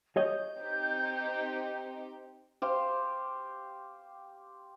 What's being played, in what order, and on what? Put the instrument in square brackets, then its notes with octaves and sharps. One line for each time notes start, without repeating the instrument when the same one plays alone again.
[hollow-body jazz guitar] C#5 D#5 [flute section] G6
[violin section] C4 D#4 G4
[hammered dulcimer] G4 C5 F5